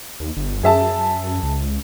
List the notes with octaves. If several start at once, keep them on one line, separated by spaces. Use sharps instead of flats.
D#2
G1
F#2 G#4 E5 A5
C#2